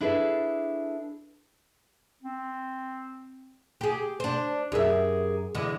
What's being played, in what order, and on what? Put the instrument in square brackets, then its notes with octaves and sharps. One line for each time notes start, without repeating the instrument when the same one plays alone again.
[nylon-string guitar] D4 E4 G#4 A4 B4
[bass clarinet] C4
[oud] G4 G#4
D4 C5
[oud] F#2 E5 [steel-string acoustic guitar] G4 G#4 A#4
[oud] E2 D3 G#3